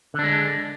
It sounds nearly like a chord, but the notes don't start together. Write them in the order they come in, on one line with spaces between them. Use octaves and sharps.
D3 D4 G#3